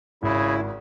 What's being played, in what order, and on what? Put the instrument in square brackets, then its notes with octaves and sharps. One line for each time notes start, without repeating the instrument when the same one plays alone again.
[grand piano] G#1 [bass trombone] C#3 [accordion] E4